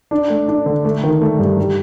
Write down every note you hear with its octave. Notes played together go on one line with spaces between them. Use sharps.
D4
A3
D4
D3
A3
D#3
A3
G2
G3